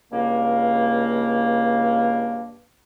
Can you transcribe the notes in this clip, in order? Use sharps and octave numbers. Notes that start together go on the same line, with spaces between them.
C#2 G2 A#3